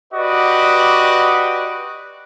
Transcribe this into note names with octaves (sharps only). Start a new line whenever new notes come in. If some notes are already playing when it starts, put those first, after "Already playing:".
F#4 G4 B4 D5 D#5